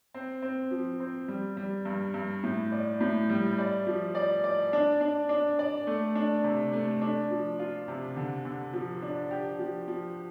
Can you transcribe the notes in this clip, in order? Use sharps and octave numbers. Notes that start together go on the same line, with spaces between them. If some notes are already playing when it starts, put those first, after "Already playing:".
C4
C4
F3
C4
G3
G3
G2
G2
A2
D5
A2
G3
D5
F3
D5
D5
D4
D4
D4
D5
A3
D4
C3
A3
D4
F3
F4
C3
D3
D3
F3
D4
G4
F3
F3